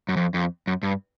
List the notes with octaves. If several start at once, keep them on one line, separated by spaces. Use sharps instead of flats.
F#2
F2
F2
F#2
G2